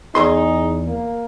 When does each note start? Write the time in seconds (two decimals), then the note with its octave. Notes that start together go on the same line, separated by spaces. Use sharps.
0.15 E2 D#4 G#4 C6
0.87 A#3